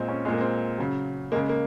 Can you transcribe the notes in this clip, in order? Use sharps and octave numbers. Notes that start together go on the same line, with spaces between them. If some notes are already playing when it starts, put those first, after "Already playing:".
Already playing: A#2 G#3 C4
C#4
A#2 G#3 C4
A#3
C4
C#3 F#3
C#3 G#3 A#3
A#3